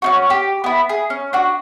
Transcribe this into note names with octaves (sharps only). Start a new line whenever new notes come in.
C#4 D#4 F#4
G4
B3 E4
G#4
C#4
D4 F#4